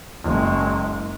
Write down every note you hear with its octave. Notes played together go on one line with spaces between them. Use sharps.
F#1 G#3